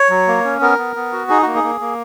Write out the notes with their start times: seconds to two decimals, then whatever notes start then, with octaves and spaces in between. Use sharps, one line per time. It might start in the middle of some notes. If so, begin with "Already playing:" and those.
Already playing: C#5
0.10 F#3
0.28 A#3
0.45 C#4
0.61 B3 A#4
0.78 B3
0.96 B3
1.12 F#4
1.29 D#4 G#4
1.42 A#3 F#4
1.55 G#4
1.64 A#3
1.81 A#3